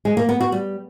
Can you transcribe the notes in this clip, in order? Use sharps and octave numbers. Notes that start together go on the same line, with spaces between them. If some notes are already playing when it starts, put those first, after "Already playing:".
G#3
A#3
B3
F#4
G3